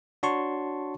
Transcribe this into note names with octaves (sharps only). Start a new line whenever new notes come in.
D4 F#4 C#5 A5 C6 C#6